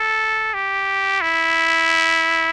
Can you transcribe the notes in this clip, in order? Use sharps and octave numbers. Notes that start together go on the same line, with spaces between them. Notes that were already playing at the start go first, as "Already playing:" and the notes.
Already playing: A4
G4
E4